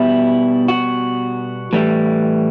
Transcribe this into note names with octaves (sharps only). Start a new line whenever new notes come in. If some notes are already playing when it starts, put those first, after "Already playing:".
Already playing: B2 G3 E4
F#4
A2 E3 G3